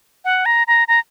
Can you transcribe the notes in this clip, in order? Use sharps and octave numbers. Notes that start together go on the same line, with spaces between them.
F#5
A#5
A#5
A#5